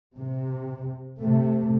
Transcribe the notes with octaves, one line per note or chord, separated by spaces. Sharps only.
C3
C3 A3